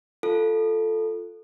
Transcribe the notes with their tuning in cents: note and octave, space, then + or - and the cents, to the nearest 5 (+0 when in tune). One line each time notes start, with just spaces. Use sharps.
F4 +0 A4 +0